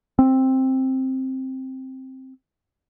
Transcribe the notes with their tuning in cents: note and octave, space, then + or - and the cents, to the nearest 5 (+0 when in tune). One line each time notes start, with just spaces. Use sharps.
C4 +5